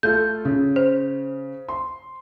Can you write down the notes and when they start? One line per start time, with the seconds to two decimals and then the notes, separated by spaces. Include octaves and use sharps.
0.03 A3 F4 A4 G6
0.45 C#3
0.76 C5
1.69 C6